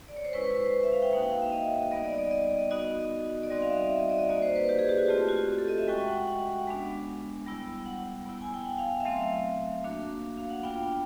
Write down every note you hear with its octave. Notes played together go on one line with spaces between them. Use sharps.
D5
C#5
C5
G#3 C#4 E4 B4
B4
C5
E5
F5
G5
A#3 D#4 F#4
G5
F5
E5
D#5
G3 B3 D#4 D#5
D5
D5
D#5
D#5
B3 D#4 F#4 D#5
D5
G3 C4 D#4 F#4 D#5
F5
E5
E5
D#5
D5
D#5
A#3 D#4 F#4 D5
C5
B4
G4
G#4
G4
F#4
A3 C4 F4 G4
F#4
G4
A4
D#5
E5
G#3 C#4 F#4 G5
F#5
F#5
F#5
G#3 B3 D4
G3 B3 E4
F#5
B3 E4
G#5
G5
F#5
F5
F5
E5
F#3 A3 C4 F5
A#3 D4 F#4
F5
F#5
B3 D4 F4 G5